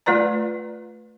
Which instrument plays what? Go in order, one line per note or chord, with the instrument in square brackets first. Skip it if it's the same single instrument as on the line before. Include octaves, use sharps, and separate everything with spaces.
[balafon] A3 F4 B4 D5 A#5